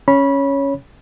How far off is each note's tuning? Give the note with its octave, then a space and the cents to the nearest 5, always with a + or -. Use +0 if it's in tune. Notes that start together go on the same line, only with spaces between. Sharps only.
C#4 +0 C#5 +0 B5 -20